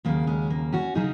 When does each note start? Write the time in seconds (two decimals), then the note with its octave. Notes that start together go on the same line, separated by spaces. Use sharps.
0.05 D#2 C#3 F#3 A#3
0.27 G#3 C#4
0.50 A#3
0.73 C#4 F#4
0.95 C#3 F#3 D#4 G#4